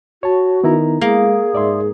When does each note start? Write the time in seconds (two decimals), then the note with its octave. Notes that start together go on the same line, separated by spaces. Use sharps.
0.23 F#4 C#5 A5
0.64 D#3 B3 E4 A#5
1.01 G#3 A#3 G#4
1.55 G#2 D5 E5 C6